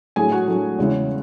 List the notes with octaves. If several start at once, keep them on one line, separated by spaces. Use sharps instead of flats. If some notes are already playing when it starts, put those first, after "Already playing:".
A2 F#3 A3 D4 G#4 G#5
F#4 F#5
A2 F#3 A3 D4
E2 C#3 G#3 C#4 E4